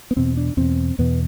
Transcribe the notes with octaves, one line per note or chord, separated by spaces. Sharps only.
B3
E2 B2 C4
D4
E2 B2 C4
E2 B2 B3